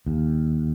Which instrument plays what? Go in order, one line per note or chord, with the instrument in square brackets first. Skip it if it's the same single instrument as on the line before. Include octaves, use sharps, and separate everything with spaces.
[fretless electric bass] D#2